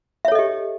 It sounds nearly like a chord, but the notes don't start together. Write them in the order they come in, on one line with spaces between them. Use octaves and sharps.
E5 C#5 A4 D#5 G4